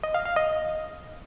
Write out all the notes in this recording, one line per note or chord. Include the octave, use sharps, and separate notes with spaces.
D#5
F5
F5
D#5